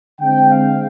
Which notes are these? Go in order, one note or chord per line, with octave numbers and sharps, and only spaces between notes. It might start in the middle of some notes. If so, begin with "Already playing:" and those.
D3 G#3 C4 G5
F5